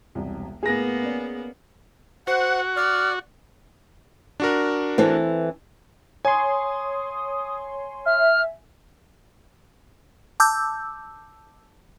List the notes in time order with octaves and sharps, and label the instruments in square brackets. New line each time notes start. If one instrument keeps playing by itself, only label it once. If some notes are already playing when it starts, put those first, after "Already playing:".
[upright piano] E1 C2
[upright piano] A2 [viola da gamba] A#3 B3 [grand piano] G#4 A#6
[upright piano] C#4 D5
[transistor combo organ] F#4 [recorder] C5 [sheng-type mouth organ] F#5
[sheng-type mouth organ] D5 [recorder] F6
[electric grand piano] D4 F#4 A#4
[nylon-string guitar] E3 C4 A4
[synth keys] C#5 C6 [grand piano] G#5 [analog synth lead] D#6
[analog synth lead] E5 [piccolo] F6
[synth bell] A5 D6 E6 G6